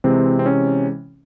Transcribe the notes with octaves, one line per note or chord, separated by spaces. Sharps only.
C3 E3 G#3 C4
C4
C#4